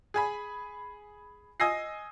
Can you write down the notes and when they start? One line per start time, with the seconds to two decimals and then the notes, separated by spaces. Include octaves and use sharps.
0.14 G#4 G#5 B5
1.60 D#5 G#5 D#6 E6 A#6 C7